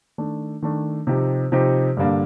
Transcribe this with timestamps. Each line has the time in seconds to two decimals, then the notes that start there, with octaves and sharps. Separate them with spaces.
0.18 D#3 A3 D4
0.62 D#3 A3 D4
1.07 C3 F3 C4 D#4 G4
1.52 C3 F3 C4 D#4 G4
1.97 G2 D3 G3 A#3 D4